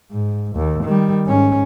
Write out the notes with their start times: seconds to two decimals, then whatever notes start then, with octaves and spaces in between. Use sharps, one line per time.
0.11 G#2
0.56 D#2
0.84 D#3 G3
1.27 G#2 C#4